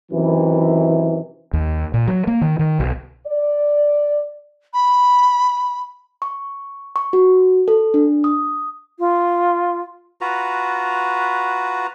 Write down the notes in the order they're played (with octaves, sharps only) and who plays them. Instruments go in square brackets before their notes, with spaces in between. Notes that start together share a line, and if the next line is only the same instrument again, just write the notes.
[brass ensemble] F#2 C3 D#3 E3
[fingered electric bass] D#2
A#2
F#3
A#3
D#3
D#3
B1
[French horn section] D5
[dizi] B5
[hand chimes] C#6
C#6
F#4
A4
D4
D#6
[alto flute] F4
[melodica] F4 F#4 B4 A#5